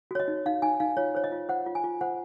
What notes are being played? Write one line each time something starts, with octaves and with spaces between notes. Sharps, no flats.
F#4 C#5
D#5
D#4
D#4 F5
D#4 G#5
D#4 F5
F4 C#5
C5 C#5
D#5
F4
C5 F#5
F4
G#5
F4
C5 F#5